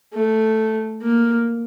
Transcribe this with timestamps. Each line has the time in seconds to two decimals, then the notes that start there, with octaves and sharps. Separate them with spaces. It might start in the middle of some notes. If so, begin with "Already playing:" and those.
0.14 A3
1.02 A#3